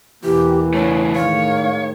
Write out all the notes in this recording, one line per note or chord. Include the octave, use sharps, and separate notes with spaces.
E2 B2 E3 A#3 G4
C#3 A3 C#5
A2 D#3 G#3 C#5 F5